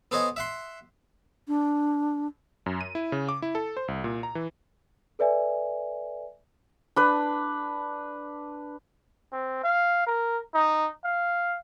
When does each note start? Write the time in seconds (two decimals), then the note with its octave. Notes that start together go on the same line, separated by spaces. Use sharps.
0.11 B3 A4 C5 C#5 D#5 G#5
0.36 E5 F#5 C6
1.48 D4
2.66 F#2
2.81 D#7
2.95 E4
3.12 C#3
3.29 D6
3.42 E4
3.55 A4
3.77 C5
3.88 C2
4.04 A#2
4.23 A#5
4.35 E3
5.19 A4 B4 D5 E5 G#5
6.96 D4 B4
9.32 C4
9.63 F5
10.07 A#4
10.54 D#4
11.04 F5